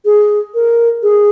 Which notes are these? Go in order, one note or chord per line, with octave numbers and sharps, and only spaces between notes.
G#4
A#4
G#4